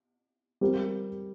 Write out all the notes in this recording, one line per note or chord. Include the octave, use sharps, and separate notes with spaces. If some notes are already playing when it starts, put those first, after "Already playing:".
G3 C4 G4 A#4